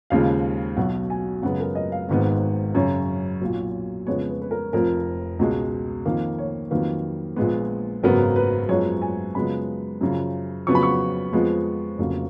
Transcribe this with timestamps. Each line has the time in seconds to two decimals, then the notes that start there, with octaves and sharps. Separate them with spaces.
0.10 D#2 C#3 F3 G#3 F5
0.77 B1 B2 F#3 F#5
1.10 G#5
1.42 F#2 C#3 G#3 B3 F#5
1.60 A#4
1.75 D#5
1.92 F5
2.09 G#1 G#2 D#3 G#3 B3
2.75 F#2 C#3 F#3 C#5
3.41 B1 A#2 F#3
4.07 F2 C#3 G#3 B3 C#5
4.29 B4
4.42 B4
4.51 A#4
4.73 F1 F2 F3 A#4
5.39 C#2 B2 G#3
6.05 F2 D#3 A#3
6.38 C#5
6.71 F2 D#3 F#3 A#3 B4
7.36 A#1 A#2 G#3 B3
8.03 G#1 F#2 C#3 F#3 B3 A#4
8.36 B4
8.69 F#2 F3 G#3 B3 C#5
9.02 G#5
9.35 F#2 C#3 F3 G#3 B3 B5
10.01 F#2 C#3 F3
10.67 F2 C#3 F#3 B3 C#6
10.75 B5
10.83 C#6
11.33 F2 F3 G#3 B3
11.98 F1 F2 C#3 F#3 A#3